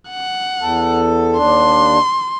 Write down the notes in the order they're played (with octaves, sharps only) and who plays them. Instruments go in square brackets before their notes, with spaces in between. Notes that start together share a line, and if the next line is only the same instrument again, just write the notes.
[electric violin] F#5
[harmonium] E2 A4
[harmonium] D#2 D4 [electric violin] C6